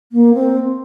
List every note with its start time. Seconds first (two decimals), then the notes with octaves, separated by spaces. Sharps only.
0.12 A#3
0.34 C4